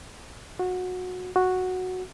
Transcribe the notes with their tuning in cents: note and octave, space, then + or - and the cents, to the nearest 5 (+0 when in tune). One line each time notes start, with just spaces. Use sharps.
F#4 -20
F#4 -5